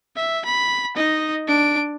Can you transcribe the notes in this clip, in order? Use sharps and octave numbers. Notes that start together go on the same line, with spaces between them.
E5
B5
D#4 D#5
D4 D7